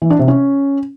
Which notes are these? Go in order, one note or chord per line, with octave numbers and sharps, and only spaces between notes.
E3
D4
C3
C#4